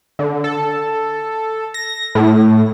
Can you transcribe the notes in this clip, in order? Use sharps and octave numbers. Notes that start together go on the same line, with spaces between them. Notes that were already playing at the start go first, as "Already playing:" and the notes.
D3
A4
A#6
A2